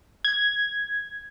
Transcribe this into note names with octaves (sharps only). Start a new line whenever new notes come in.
G#6